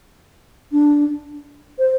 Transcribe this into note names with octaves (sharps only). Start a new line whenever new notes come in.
D4
C5